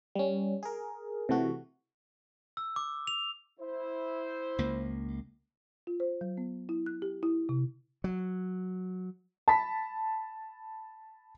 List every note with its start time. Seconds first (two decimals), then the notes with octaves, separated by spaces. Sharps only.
0.15 G3 C#4
0.63 G#4 A#4
1.29 C3 E3 A3 F#4
2.57 E6
2.76 D6
3.07 F7
3.60 E4 C5
4.59 C#2 A#3
5.87 F4
6.00 C5
6.21 F#3
6.37 B3
6.69 E4
6.86 F#6
7.02 G4
7.23 E4
7.49 C3
8.04 F#3
9.48 A5 B5 B6